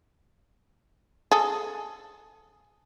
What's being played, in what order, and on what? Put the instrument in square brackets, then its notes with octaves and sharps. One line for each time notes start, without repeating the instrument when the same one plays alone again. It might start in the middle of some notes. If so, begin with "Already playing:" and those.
[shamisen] G#4 A4